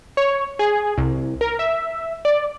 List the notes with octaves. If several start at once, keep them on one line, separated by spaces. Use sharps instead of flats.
C#5
G#4
C2
A#4
E5
D5